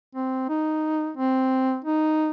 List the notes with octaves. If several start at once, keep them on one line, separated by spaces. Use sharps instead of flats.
C4
D#4
C4
D#4